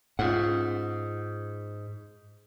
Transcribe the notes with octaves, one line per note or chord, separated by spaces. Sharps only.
G#2 C#4 F4 F#5